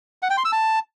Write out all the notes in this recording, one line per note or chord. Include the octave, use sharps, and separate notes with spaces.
F#5
G5
C6
E6
A5